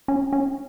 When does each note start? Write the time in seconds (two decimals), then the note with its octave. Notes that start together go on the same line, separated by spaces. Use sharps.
0.08 C#4
0.33 C#4